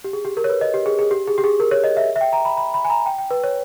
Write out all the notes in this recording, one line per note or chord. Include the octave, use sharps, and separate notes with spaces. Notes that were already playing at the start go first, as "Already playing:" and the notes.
G4
G#4
G4
A#4
C#5
B4
D#5
G4
G#4
G#4
G4
G#4
G4
G#4
A#4
C#5
D#5
E5
E5
G5
A#5
B5
B5
B5
G#5
A#5
G5
G5
B4
C#5